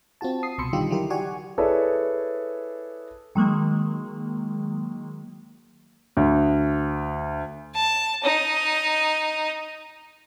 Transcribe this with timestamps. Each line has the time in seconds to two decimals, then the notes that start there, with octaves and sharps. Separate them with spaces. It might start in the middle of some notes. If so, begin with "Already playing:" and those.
0.21 C4 F4 F#4 A5
0.43 D#6 C7
0.58 C2 B2 B5 C6 E6 C#7
0.73 D3 D#3 G3 D#4 F4 G4
0.89 D#3 E3 F#3 E4 G4 A#4
1.10 F#4 G4 D5 F#5 G#5 C#6
1.58 E4 G#4 A4 B4 C#5 D5
3.35 D#3 F#3 G#3 A#3
6.17 D2
7.74 A5
8.24 D#4